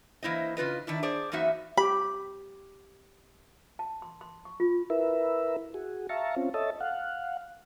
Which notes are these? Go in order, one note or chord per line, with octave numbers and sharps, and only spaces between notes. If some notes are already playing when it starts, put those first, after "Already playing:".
E3 A#3 E4 C5 D#5
C#3 F4 B4 D#5
D#3 D4 E4
G#4 C5 D5
F#2 E3 A#3 D#4 F#4 E5
G4 B5
A5
C6
C6
C#6
F4
E4 A#4 B4 E5
F#4 G#4
E5 F5 A5 A#5 C#6
C4 C#4 F4
A4 C#5 D#5 E5 A5
F5 F#5